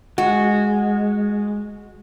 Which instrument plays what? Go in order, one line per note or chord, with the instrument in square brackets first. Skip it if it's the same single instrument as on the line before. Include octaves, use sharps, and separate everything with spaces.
[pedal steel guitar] G#3 [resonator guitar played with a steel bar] F#4